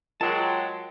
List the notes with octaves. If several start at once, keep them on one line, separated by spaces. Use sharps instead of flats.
F#3 G#3 F4 A#4 G5 A5